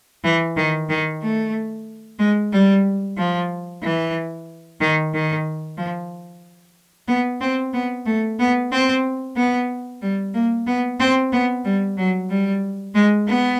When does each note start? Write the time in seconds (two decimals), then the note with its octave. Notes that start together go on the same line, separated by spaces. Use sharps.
0.24 E3
0.57 D#3
0.89 D#3
1.22 A3
2.19 G#3
2.52 G3
3.17 F3
3.83 E3
4.81 D#3
5.13 D#3
5.77 F3
7.08 B3
7.41 C4
7.74 B3
8.06 A3
8.39 B3
8.72 C4
9.37 B3
10.02 G3
10.34 A#3
10.67 B3
11.00 C4
11.32 B3
11.64 G3
11.98 F#3
12.30 G3
12.95 G#3
13.27 B3